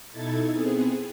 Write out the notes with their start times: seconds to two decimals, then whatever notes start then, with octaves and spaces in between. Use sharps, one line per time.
0.11 B2 D#4 E4 A4 G#6 A6
0.52 B3 C4 G#4